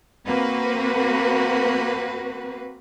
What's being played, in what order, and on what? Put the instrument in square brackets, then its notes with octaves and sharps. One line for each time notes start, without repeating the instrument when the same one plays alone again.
[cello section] A#3 C4 F#4 B4